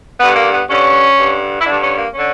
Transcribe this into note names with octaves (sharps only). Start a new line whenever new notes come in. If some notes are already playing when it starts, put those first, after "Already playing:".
G2 D3 B3
A#3
B3
G2 D3 C#4
G2 D3
E4
G2 D3 D4
C#4
A#3
D3 C#4